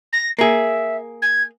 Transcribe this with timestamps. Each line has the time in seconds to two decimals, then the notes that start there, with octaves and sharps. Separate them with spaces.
0.12 A#6
0.39 A#3 G#4 E5
1.22 G#6